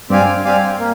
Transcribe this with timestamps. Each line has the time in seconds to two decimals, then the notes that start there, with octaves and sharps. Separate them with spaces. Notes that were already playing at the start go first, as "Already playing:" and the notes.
0.10 G2 C4 G4 D5 F5 G#5
0.45 C4 G4 D5 F5 G#5
0.79 A#3